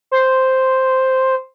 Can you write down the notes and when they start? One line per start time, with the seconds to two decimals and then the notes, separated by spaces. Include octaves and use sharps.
0.11 C5